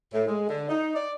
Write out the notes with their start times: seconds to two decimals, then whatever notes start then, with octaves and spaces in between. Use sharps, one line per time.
0.13 A2
0.27 G#3
0.48 D3
0.69 D#4
0.95 D5